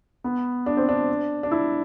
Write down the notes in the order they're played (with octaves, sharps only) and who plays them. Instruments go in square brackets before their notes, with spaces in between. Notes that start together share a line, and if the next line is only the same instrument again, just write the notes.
[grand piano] B3
D4
C4
D4
D4
E4